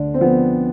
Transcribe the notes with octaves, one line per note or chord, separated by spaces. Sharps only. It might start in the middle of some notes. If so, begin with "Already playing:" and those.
Already playing: D2 D3 D4
C4
F3 B3